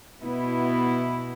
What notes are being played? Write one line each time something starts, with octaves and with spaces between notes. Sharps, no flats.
B2 B3 E4